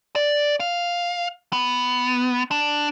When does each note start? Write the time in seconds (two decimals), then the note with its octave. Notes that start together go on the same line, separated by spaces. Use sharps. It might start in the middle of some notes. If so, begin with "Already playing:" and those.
0.16 D5
0.60 F5
1.53 B3
2.51 D4